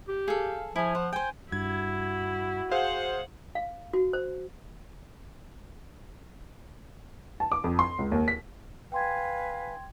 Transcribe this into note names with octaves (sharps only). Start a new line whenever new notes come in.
G4
G#4 A4 F5
F3 E4 G#4 G#5
C5 F#5
C5 G5 G#5
G2 E4 F#4 G#6
G#4 C5 F5 F#5
F5
F#4
C5
A5
D6
F2
C6
C#2
D#2
B6
B4 F5 G5 G#5 C6 G#6